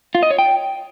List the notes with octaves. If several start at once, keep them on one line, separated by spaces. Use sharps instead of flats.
F4
D#5
C#5
G5